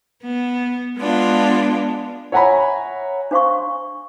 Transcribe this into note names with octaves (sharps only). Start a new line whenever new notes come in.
B3
G#3 B3 D4 F4
C#5 E5 F#5 G#5 A#5 B5
D4 C5 F5 C6 C#6